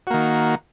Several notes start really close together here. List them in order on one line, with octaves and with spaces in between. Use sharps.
F#4 A#3 D#3